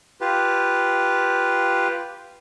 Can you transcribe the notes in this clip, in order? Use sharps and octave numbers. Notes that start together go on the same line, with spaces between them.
F4 G4 B4